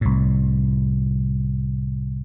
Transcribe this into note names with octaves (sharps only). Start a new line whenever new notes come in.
C2 A2